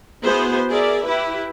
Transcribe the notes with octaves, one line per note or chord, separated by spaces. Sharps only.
B3 E4 F#4 G#4 C5
G#4 A#4 D5 E5
E4 G4 B4